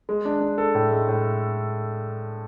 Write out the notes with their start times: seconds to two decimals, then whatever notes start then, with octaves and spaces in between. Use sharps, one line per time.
0.09 G#3
0.25 D4
0.41 D4
0.58 A4
0.75 A2
0.91 G#3
1.08 A2